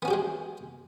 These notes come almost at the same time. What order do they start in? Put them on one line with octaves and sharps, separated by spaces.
B3 C#4 F#4 G4 G#3